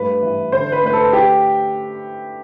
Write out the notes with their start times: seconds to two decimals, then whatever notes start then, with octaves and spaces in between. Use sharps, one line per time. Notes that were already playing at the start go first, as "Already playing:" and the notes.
Already playing: G2 A3 B4
0.22 E3
0.52 D3 C5
0.72 B4
0.83 A3 B4
0.93 A4
1.13 G4